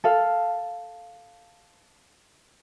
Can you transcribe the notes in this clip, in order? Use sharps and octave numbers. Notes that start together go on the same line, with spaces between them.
A4 F5